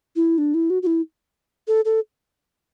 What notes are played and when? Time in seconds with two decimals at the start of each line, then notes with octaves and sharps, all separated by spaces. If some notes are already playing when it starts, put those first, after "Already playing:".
0.16 E4
0.38 D4
0.54 E4
0.70 F#4
0.83 F#4
0.87 E4
1.68 A4
1.85 A4